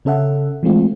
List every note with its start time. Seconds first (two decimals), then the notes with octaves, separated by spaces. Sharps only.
0.05 C#3 C#4 A4 E5 F#5
0.63 E3 G#3 A3 C4 F4